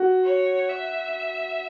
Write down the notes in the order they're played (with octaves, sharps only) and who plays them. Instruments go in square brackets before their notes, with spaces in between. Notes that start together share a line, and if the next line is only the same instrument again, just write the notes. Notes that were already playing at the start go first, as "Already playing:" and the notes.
Already playing: [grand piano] F#4
[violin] C#5
E5